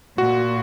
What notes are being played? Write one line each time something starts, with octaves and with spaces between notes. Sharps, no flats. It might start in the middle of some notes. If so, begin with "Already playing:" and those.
A#2 F#4